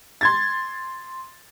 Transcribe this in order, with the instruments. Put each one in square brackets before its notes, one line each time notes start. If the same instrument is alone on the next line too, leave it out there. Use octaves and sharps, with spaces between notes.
[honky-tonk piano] C6 G#6 A6